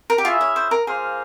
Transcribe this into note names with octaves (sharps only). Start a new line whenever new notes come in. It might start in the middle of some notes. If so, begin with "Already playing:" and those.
A#4
G4
C#4 E4 F4 G#4 E5
C#5
C5
A#4
A#3 F4 G#4 C5 F5